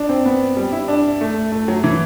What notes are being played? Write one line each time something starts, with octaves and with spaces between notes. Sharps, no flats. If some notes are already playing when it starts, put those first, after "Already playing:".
Already playing: D4
C4
B3
G3
E4
D4
A3
A3
F#3
E3